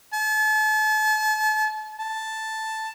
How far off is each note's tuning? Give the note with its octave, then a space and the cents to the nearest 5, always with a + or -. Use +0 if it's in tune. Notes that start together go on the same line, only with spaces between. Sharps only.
A5 -35
A5 +0